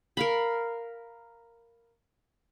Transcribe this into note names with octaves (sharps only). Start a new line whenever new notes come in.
A#4 F5 B5